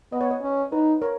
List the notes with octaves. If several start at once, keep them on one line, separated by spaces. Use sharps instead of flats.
B3 D#5
C#5
B4 D#5
C#4
D#4 B4
A#4 C#5